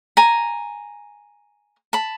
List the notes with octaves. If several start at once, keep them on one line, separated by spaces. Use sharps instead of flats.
G#5 A#5
A5 B5